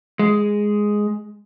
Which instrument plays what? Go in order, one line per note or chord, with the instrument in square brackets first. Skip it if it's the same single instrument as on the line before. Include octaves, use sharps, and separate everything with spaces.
[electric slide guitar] G#3